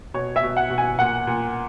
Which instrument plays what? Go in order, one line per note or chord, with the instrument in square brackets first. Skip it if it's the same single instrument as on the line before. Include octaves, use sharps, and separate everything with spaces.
[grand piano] B2 C#5
E5
B2
F#5
B2
G#5
A#2 F#5
A#2